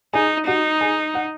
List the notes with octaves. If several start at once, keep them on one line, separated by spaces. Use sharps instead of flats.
D#4 G#4 G#5
D#4 F#4 F#5
G#4 G#5
F#5